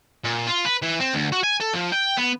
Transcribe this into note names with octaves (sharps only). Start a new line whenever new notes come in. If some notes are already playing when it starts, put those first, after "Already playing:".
A#2
F4
B4
E3
C4
D2
F#4
G#5
A4
F3
G5
B3